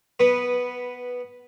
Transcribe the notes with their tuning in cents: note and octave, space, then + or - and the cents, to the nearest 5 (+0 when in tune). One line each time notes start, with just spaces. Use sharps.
B3 +0 B4 -10